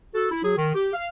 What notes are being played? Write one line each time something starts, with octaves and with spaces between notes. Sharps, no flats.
F#4 A4
E4
F#3 F#4 G#4
D#3
G4
F5